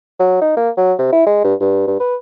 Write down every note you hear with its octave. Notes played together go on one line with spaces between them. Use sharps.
F#3
D#4
A#3
F#3
C3
E4
G#3
G2
G2
G2
B4